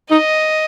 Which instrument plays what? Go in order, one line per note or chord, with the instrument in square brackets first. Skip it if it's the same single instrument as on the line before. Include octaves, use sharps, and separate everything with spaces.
[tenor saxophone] D#4 [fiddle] D#5